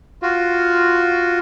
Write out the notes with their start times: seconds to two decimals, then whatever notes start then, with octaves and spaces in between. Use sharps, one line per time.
0.22 F4 F#4